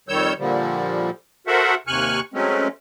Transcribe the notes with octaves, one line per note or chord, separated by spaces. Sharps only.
F2 D#3 G3 C#5 E6 G6
A#2 D3 F3 G3
F#4 A4 A#4 C5 E5 F#5
D#2 C3 G#5 C#6 F6 F#6
F#3 G#3 A3 C4 C#4